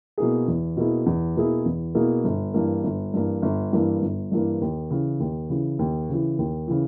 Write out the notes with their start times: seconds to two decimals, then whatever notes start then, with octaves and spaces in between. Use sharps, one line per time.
0.18 B2 A#3 E4 G#4
0.48 E2
0.77 B2 A#3 E4 G#4
1.06 E2
1.36 B2 A#3 E4 G#4
1.66 E2
1.95 B2 A#3 E4 G#4
2.24 G1
2.54 G2 E3 A#3
2.84 G1
3.14 G2 E3 A#3
3.42 G1
3.73 G2 E3 A#3
4.02 G1
4.32 G2 E3 A#3
4.61 D#2
4.90 C#3 E3
5.20 D#2
5.50 C#3 E3
5.79 D#2
6.09 C#3 E3
6.39 D#2
6.68 C#3 E3